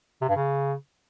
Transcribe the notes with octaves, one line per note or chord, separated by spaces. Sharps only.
C3
G2
C#3